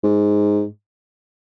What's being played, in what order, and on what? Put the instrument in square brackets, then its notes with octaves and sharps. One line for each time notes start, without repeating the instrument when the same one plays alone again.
[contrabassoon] G#2